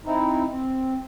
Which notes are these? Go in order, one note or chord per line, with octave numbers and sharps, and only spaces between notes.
C4 D#4 E4
C4